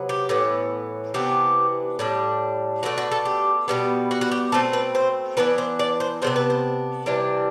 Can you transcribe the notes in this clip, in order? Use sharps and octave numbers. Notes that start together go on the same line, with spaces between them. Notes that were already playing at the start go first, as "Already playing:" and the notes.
Already playing: C3 F#3 B3
G4
A2 E3 B3
C3 E3 B3 D4 G4
A2 G3 D4
B2 A3 D4 F#4
F#4
A4
G4
B2 G3 B3
F#4
F#4
G4
B2 A3 C4 A4
B4
C5
E3 B3 D4 B4
C5
D5
C5
C3 G3 B3 D4 C5
B4
C5
C3 E3 G3 D4